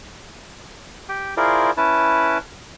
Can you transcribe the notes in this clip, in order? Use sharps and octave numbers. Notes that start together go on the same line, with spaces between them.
G4 G5
E4 F4 G#4 A#4 C5 D5
C#4 E4 B4 A5